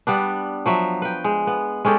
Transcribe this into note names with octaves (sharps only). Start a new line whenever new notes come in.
G3 B3 D4
F3 F#3 E5
B4 G5
G#3
B3
G#3 C#4 G4 A4